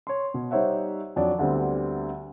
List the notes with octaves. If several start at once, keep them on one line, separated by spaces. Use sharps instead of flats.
C#5 C6
B2
G3 D#4 C5 C#5 E5 F#5
F2 F#3 D4
D2 D3 G3 B3 C4